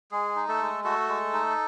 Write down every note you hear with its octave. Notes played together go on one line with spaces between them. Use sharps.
G#3 G#4
D#4
A3 A4
G#3
A3 F#4 A4
G#3
D#4